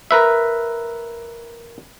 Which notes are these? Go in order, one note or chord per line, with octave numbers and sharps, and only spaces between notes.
A#4 B4 E5